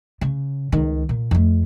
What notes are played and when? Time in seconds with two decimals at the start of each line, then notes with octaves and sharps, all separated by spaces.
0.21 C#3
0.72 C#2 D#3
1.09 A#2
1.31 F2 A3